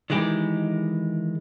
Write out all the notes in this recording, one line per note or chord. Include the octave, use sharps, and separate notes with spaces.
D#3 E3 G#3 G4